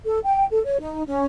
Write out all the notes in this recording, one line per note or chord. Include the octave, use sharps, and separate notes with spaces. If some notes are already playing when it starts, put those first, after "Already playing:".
A4
G5
A4
C#5
D#4
C#4